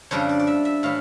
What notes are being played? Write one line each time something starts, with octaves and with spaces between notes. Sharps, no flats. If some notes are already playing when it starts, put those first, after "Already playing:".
F2 C#3 G3 D4 C#5
D5
D5
E5
E5
A2 E3 F5